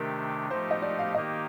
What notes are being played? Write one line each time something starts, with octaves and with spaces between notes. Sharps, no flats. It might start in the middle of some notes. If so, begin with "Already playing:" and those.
Already playing: C3 D#3 A3 D4 G4 A#4
F3 A3 D#4 G4 C5
D#5
D5
F5
D#3 A#3 D#4 G4 D#5